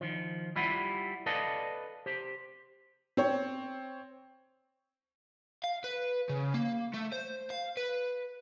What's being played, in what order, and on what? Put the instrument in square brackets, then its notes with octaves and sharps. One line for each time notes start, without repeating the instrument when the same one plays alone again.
[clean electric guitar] D#3 F3
G3 E4 F4 G4 F#5
A4 B4 D5 D#5 F5 A5
G4 C5
[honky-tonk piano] C4 C#5
[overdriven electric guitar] F5
B4
C#3
A#3
A3
C5
F5
B4